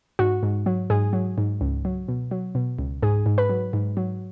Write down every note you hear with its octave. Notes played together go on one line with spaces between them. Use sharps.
G#2 F#4
G#2
F#3
G#2 G#4
F#3
G#2
C#2
F#3
B2
F#3
B2
C#2
G#2 G#4
G#2
B4
F#3
G#2
F#3